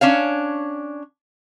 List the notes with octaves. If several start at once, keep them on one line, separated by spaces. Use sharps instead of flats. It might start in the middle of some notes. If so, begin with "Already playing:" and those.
C#4 D4 C#5 F5